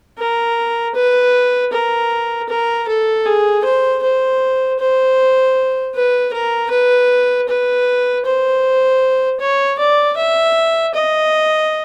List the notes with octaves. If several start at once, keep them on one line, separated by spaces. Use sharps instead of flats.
A#4
B4
A#4
A#4
A4
G#4
C5
C5
C5
B4
A#4
B4
B4
C5
C#5
D5
E5
D#5